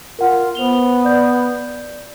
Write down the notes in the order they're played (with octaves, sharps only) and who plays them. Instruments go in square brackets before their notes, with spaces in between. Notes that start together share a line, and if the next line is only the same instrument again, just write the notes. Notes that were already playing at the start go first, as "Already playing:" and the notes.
[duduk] F4 [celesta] A#4 F#5
[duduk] B3 [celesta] C5 F7 G7
[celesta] D5 G6